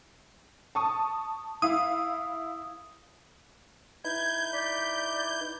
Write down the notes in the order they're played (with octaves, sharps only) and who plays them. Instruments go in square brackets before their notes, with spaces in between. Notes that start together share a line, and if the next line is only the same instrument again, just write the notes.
[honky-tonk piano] A5 C#6 D#6
[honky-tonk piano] E4 F5 [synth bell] D#6
[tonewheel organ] D#4 E4 B4 [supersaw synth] G6 [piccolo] G#6
[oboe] D5 [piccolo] B6
[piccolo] G#6